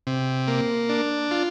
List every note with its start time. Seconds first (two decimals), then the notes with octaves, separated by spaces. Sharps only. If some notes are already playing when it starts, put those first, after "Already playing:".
0.07 C3
0.48 A#3
0.89 D4
1.31 F4